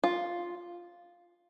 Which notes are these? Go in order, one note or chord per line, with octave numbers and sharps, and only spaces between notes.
F4